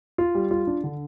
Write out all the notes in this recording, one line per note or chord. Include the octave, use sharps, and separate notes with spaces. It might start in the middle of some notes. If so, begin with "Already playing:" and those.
F4
G3
F4
D4
D3